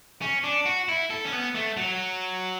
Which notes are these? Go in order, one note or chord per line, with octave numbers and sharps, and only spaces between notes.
C#4
D4
F#4
E4
A4
C#4
B3
A3
F#3